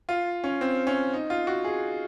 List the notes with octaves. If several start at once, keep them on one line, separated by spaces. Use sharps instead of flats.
F4
C#4
C4
C#4
D#4
F4
F#4
G#4